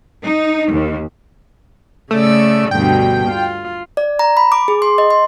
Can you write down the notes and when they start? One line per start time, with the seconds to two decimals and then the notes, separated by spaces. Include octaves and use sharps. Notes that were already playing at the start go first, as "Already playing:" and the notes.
0.23 D#4
0.71 D#2
2.11 C#3 A3 D5 E6
2.71 D2 G2 B2 G5
3.30 F4
3.97 D5
4.19 A#5
4.37 B5
4.52 D6
4.68 G#4
4.82 C6
4.98 D#5
5.10 C6